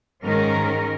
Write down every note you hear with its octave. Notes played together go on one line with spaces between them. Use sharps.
G#2 D#3 G#3 C#4 A#4